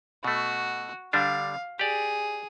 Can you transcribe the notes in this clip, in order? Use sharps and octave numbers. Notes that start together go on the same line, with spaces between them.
B2 A3 F#4
D3 G3 D4 F5
G4 G#4 D5